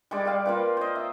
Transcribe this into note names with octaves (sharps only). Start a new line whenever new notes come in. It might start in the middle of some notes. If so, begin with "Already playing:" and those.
G3 G#3 D5 G5
G3 F5
A#3 F4 B4
C5 D#5
E5